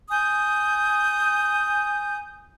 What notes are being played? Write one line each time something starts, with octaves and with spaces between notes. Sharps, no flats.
G#5 D#6 G6